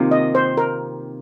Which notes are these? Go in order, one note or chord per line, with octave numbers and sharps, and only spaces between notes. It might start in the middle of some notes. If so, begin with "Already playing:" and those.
Already playing: C3 D#3 A#3 F4
D#5
C5
A#4